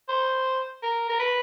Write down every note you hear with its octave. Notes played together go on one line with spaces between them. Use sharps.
C5
A#4
A#4
B4